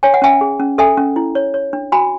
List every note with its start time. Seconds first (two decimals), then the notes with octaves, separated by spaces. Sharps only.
0.03 C#5 G#5
0.14 F#5
0.22 C#4 E5 G#5
0.41 G#4
0.60 C#4
0.78 A4 E5 G#5
0.97 C#4
1.16 E4
1.35 C#5
1.54 C#5
1.73 D4
1.92 F#4 G#5 B5